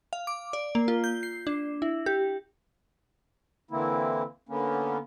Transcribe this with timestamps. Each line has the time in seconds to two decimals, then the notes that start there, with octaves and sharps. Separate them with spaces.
0.13 F5
0.27 D6
0.53 D5
0.75 A#3
0.88 F4
1.04 G6
1.23 C7
1.47 D4
1.82 E4
2.06 G4
3.71 D3 E3 A#3 C4 E4
4.49 D3 A#3 B3 C#4